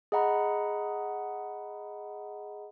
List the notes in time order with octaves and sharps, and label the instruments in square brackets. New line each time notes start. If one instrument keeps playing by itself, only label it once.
[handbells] G#4 D#5 F#5 A#5 B5